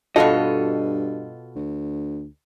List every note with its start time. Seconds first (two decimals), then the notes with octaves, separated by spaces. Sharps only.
0.16 G2 B2 F4 F#4 A4 D#5
1.56 D2